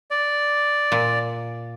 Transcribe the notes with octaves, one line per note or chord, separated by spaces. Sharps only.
D5
A#2